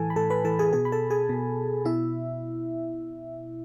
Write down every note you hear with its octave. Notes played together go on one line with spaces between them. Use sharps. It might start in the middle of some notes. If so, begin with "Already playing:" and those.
Already playing: A2 E3 A4 G#5 A5
B5
A2 A4 A5
B4 B5
E3 A4 A5
G#4 G#5
B2 G#4 G#5
B5
A4 A5
G#4 G#5
B2
B2 E4 E5